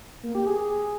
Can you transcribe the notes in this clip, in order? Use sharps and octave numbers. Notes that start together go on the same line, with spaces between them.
A#3
G4
G#4